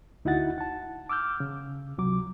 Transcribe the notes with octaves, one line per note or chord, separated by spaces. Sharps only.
D2 D#4 E4 F#4 F#5 A6
F#5 A5
D6 E6 F6 G6
C#3
C#2 C3 F#3 D6